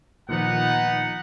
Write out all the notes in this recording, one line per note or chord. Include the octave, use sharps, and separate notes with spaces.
A#2 D#3 F3 B3 D#4 F#5